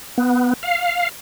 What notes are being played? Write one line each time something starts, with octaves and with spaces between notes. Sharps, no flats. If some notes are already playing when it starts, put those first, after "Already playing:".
B3
F5